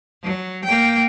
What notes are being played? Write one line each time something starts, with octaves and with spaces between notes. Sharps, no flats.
F#3
A#3 G5